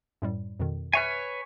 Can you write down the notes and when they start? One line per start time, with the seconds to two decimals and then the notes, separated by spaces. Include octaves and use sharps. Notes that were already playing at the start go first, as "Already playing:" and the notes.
0.22 F#2 A2 G3
0.60 F2 B2 D#3
0.93 B4 C#5 E5 G#5 F6